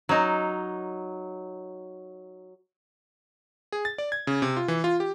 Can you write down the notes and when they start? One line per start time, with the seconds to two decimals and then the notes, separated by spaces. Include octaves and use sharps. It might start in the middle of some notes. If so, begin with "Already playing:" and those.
0.09 F#3 D#4
3.72 G#4
3.85 A6
3.98 D5
4.12 G#6
4.27 C#3
4.42 C3
4.57 F4
4.68 E3
4.84 F4
5.00 G4